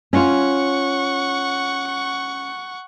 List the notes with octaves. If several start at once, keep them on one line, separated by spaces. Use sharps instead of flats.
C#4 F4 F#5 C#6